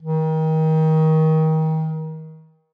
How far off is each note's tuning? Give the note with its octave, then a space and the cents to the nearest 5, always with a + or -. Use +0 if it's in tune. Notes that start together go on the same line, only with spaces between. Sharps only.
D#3 +30